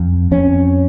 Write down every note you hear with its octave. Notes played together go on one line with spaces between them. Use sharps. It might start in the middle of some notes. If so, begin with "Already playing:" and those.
Already playing: F2
F2 C#4